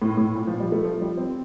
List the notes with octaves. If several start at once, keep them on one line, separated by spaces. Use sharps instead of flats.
A2
A2
A#2
F3
G3
A3
F3
G3
C4